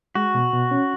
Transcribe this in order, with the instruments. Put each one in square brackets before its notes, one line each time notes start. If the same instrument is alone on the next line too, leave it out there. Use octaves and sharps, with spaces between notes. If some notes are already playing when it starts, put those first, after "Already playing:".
[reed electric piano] G#3 [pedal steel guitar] F#4
[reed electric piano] B2
B2
C#4